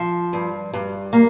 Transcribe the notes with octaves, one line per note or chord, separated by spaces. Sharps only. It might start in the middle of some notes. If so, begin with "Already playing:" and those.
Already playing: F3
G2
G2
A#3